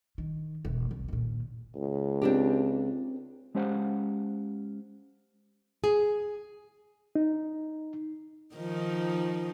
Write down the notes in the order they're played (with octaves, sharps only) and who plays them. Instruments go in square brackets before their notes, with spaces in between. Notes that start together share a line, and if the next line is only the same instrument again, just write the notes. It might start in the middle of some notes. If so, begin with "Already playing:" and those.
[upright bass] D#3
E1
C2
D#2 A#2
[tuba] C#2
[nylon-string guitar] C4 D4 G4
[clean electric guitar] G#3 C#4 G4 C5 F5 F#5
[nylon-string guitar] G#4
[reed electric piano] D#4
[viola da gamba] D#3 F3 D#4